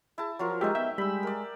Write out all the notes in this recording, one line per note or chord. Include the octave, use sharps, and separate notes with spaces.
E4 G#4 A5
F3 F#3 F4 A#4
G#3 D#4 G4 E5
B3 E5 G5
G3 G#3 B5 E6
A#4 D5